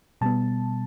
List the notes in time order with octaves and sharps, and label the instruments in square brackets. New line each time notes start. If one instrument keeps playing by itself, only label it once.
[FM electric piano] B2 G3 B3 A5